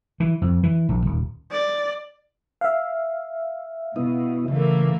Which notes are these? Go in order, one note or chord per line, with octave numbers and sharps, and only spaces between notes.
E3
F2
E3
A#1
D#1
D5
E5 F5
B2 B3 E4 D#5
C#3 E3 A3 A#3